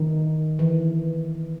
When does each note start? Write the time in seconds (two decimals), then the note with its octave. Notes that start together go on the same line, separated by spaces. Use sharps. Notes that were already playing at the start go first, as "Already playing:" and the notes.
Already playing: D#3
0.59 E3